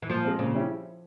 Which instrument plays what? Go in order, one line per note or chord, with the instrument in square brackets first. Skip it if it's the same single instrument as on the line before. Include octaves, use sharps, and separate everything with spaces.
[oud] E3
[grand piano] A#2 [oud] F3
[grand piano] G#3 C4
[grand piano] A#2 [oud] C#3
[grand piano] G3 C#4 E4